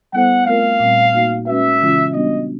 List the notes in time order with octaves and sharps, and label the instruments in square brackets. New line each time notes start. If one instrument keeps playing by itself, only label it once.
[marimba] G3 B3 E4 A4 C5 [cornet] F#5
[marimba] A3 C4 F4 A#4 [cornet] F5
[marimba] A#2 G3 C4
A#3 D#4 F#4
[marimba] G#3 C#4 F#4 B4 [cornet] E5
[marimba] C#3 E3 G#3 C#4 F4
[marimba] G3 B3 D4 F#4 [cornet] D#5